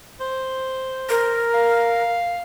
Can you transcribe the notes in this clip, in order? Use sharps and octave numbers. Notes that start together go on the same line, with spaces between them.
C5
A#4
F5